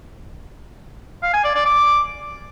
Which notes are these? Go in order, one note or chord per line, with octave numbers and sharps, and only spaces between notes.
F5
G#5
D5
D5
D6